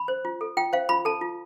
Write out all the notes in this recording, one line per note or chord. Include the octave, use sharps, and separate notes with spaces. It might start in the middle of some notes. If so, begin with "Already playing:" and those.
Already playing: B5
C5
F4
A4
F4 G5
C5 F5
F4 B5
A4 A5
F4